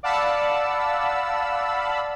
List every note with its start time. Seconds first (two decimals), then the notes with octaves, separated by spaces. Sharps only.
0.03 D5 F5 F#5 A5 B5 E6